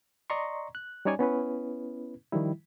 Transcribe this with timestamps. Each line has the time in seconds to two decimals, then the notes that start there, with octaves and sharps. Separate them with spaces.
0.30 D5 D#5 A#5 C6 C#6
0.75 F#6
1.05 G3 C#4 D#4 C#5 D5 G#5
1.19 B3 C#4 E4 B4
2.32 D#3 F3 G3 E4